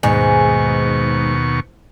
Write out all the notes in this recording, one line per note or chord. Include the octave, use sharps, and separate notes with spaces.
D#2 G#2 B2 C#6